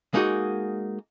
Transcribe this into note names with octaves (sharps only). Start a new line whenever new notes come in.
G#3 A#3 D#4 F#4 G#4